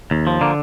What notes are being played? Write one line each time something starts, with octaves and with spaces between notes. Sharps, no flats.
D#2
F3
D3 A#3